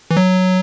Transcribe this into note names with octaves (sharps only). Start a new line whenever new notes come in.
E3
F#3